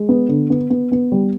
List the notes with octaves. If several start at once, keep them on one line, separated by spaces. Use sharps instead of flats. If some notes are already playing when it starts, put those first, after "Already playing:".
Already playing: G#3
B3
D3
B3
B3
B3
G3